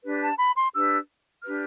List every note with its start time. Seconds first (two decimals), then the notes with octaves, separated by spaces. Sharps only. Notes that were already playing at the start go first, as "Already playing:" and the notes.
0.04 D4 G4 B4
0.21 A5
0.38 B5
0.57 C6
0.74 D4 G4 B4 E6
1.43 D4 G4 B4 F6